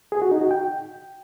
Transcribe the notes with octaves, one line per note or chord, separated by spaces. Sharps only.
G#4
F#4
D#4
F#4
G5